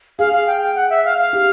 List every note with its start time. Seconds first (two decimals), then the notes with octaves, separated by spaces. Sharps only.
0.19 G#4 F5
0.33 F5
0.47 G5
0.62 G5
0.75 F#5
0.90 E5
1.05 F5
1.18 F5
1.33 G4